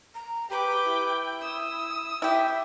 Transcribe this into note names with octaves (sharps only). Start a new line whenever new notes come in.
A#5
G4 B4 G5 D6
E4
D#6 E6
E4 G4 E5